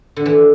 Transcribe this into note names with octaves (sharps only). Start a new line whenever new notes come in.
D3
E3